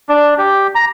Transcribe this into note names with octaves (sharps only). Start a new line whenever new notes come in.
D4
G4
A#5